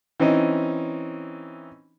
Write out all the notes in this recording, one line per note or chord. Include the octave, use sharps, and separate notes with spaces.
E3 C4 C#4 D#4